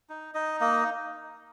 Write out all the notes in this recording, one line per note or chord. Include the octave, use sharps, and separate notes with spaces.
D#4
D#4 D#5
A#3 D#5